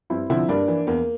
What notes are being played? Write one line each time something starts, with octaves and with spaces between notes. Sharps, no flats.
G2 C4 E4
D3 F3 C4 E4
G2 A#3 D4
E3
E2 A#3